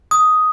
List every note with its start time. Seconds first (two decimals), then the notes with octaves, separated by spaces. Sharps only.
0.11 D#6